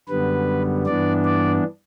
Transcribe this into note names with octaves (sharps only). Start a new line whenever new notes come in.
F#2 D3 G3 B3 B4
G2 E3 B3 D4 D5
D5